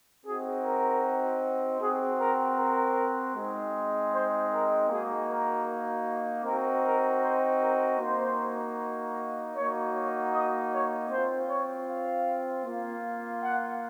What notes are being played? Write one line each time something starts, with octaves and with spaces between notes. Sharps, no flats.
C4 D#4 F#4 G#4
A#4
C4 F#4 G#4
A#4
A#4
G#3 C4 D#4
C5
A#4
A#3 D#4 F#4 G#4
A#4
C4 D#4 F#4 A#4
A#4
C5
A#4
A#3 D#4 F#4 C5
A#3 D#4 F#4 C#5
C#5
D#5
C#5
C4 F4 C5
C#5
F5
A#3 F4
F#5